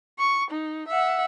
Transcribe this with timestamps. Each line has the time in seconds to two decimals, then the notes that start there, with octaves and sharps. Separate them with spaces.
0.19 C#6
0.51 D#4
0.88 E5 F#5